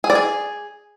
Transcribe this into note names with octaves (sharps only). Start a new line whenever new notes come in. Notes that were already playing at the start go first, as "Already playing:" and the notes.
G#4
D5
G#4